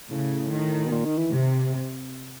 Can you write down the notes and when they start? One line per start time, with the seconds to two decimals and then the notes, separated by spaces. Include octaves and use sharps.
0.11 A2 C#3
0.51 D#3
0.86 B2
0.91 A#2
1.05 D#3
1.18 E3
1.31 C3